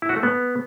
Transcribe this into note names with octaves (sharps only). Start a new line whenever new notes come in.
E4
F#4
A3
B3